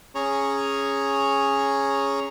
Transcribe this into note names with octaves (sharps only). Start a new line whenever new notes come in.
C#4 G#4 C#5 A#5